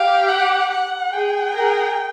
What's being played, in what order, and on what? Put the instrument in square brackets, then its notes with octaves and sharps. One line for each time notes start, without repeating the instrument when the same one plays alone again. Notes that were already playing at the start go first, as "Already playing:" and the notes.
Already playing: [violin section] G4 [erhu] F5
[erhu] F#5
F#5
[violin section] G#4 [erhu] G5
[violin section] G#4 A#4